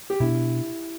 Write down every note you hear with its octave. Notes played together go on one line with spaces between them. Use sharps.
G4
B2 B3 D4 E4